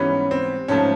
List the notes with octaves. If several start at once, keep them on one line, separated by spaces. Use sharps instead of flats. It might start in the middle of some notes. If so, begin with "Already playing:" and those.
Already playing: G#2 E3 G3 B3 C#4
C4
G#2 F3 A3 C#4